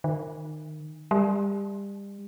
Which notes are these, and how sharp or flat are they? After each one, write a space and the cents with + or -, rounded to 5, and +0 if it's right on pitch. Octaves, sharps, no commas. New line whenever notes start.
D#3 -20
G3 +30